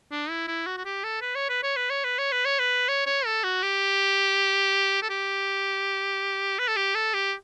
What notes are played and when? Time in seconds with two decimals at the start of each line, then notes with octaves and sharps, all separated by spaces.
0.11 D4
0.30 E4
0.48 E4
0.66 F#4
0.77 F#4
0.85 G4
1.04 A4
1.21 B4
1.35 C#5
1.49 B4
1.63 C#5
1.76 B4
1.90 C#5
2.04 B4
2.18 C#5
2.32 B4
2.45 C#5
2.59 B4
2.88 C#5
3.06 C#5
3.26 A4
3.44 F#4
3.62 G4
5.02 A4
5.10 G4
6.59 B4
6.68 A4
6.76 G4
6.95 A4
7.14 G4